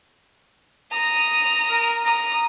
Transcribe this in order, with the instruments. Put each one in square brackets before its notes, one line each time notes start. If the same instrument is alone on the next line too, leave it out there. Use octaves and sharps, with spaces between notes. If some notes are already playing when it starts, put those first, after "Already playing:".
[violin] A#5 D#6
[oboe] A#4
[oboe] A#5 [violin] D#6